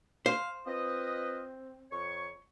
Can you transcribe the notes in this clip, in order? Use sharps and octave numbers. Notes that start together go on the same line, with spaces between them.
C5 F5
C4 F4 B4 D#5
F2 C#5 C#6